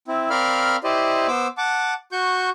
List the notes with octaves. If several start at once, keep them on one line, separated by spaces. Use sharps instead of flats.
C4 E4
C4 A#4 D5 F5 B5 F6
E4 G4 C5 D5 D#5
B3 C5 D6 E6
F#5 A5 D6
F#4 C#6 G6